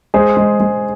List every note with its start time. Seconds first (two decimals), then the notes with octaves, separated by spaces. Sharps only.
0.14 G#3 G#4 C5
0.37 G#3
0.60 G#3